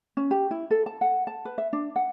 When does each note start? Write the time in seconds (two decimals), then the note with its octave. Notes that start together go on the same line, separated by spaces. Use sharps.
0.17 C#4
0.31 G4
0.51 E4
0.71 A4
0.86 A5
1.01 F#5
1.27 A5
1.45 B4
1.58 E5
1.73 D4
1.96 F#5